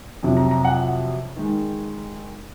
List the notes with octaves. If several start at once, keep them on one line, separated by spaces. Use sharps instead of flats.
F2 C3 F#3
A#5
A#5
F#5
D#3 G#3